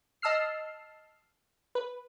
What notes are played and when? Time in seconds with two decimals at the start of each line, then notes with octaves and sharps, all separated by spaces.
0.22 D#5 A5 E6 F6 C7
1.75 B4